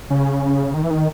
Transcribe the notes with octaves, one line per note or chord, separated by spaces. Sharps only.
C#3
D#3
E3
D#3